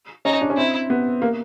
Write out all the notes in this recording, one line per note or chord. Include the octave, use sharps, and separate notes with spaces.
C#4 D#4
D4
C#4
C4 E4
B3
A#3